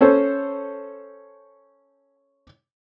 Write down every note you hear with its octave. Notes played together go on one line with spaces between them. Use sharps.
C#4 A4 C5 C#5